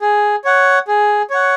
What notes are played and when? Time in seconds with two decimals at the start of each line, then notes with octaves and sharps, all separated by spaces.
0.01 G#4
0.45 C#5 F#5
0.88 G#4
1.30 C#5 F#5